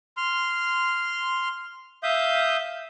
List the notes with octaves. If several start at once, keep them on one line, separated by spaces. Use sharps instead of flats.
C6 F6
E5 F5 D#6 G6